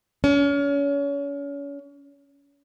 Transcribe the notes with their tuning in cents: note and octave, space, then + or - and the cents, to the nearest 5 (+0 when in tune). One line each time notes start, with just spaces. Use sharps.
C#4 +35